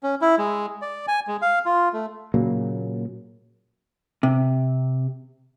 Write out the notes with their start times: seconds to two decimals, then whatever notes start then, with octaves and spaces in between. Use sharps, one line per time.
0.03 C#4
0.22 E4
0.38 G#3
0.82 D5
1.08 G#5
1.28 G#3
1.42 F5
1.66 F4
1.93 A3
2.34 A#2 C#3 F#3 A#3
4.23 C3